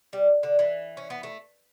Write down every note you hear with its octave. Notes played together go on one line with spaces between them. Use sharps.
G3
D3
E3
C#4
B3
A3